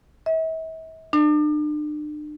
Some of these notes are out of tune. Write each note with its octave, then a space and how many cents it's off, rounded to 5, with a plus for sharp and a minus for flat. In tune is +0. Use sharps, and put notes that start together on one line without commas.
E5 -40
D4 +40